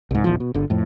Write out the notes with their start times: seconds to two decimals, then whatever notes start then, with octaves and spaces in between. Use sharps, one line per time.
0.11 C2 G#2
0.24 D#1 A#1 E2 F3
0.40 B2
0.54 G1 D3
0.70 F2 A2